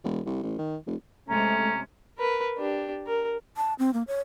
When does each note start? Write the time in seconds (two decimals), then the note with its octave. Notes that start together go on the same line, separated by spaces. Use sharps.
0.04 E1
0.26 C2
0.43 A1
0.58 D#3
0.86 F1
1.29 C3 G#3 A3 C#4 A#5
2.18 A#4 B4
2.58 D4 G4
3.07 A#4
3.57 A5
3.79 C4
3.93 A#3
4.07 C#5